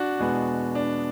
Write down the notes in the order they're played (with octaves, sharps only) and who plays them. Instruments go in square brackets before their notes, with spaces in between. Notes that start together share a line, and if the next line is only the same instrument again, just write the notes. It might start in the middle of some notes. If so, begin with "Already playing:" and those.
Already playing: [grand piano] D4 F#4
E2 B2 G#3 B3
D4